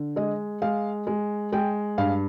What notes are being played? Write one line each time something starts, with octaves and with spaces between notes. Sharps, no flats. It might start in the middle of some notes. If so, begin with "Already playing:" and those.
Already playing: D3
G#3 D#5
G#3 F5
G#3
G#3 G5
G2 F5